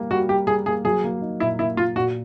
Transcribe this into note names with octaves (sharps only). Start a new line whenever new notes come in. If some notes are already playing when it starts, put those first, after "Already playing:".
Already playing: G3 A#3
G3 F#4
G3 G4
G3 G#4
A#3 G#4
F#3 G#4
A#3
D#4
A#2 E4
A#3 E4
A#3 F4
A#2 F#4